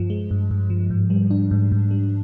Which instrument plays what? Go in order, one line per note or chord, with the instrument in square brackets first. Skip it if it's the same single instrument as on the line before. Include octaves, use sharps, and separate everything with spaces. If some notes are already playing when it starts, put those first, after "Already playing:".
Already playing: [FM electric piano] G2 F3
G#3
G2
G2
F3
G#2
G3
D4
G#2
G#2
G3